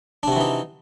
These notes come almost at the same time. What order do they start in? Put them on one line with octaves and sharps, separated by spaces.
D4 C3 F#4 E3 D#4